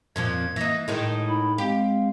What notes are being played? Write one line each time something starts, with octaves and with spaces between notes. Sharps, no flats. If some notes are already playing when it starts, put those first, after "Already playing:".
F2 A#2 F3 G#6
E3 A#3 D#4 A#6
A2 D#3 G#3 E4
D#4 B5
G#3 C4 G4 F5